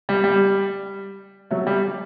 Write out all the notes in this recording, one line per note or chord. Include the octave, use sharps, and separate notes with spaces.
G3
G3
F#3 A3
G3